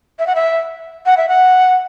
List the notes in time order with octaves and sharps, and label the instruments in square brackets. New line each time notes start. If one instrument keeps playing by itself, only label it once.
[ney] E5
F#5
E5
F#5
E5
F#5